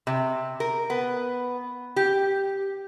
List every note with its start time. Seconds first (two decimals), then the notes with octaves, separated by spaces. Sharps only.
0.07 C3
0.60 A#4
0.90 B3
1.96 G4